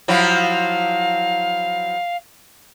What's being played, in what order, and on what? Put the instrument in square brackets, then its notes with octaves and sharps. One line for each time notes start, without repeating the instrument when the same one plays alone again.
[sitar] F3 F#3 E4 [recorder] F5